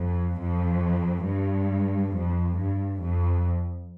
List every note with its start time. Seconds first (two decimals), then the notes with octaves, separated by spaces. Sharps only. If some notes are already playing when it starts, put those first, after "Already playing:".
Already playing: F2
0.36 F2
1.24 G2
2.12 F2
2.56 G2
3.00 F2